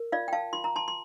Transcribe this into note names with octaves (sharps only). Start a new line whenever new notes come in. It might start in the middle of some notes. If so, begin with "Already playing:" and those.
Already playing: A#4
F4 D5 F5
G5
F5 A5
F4 C6
A#5
A5 C6
C6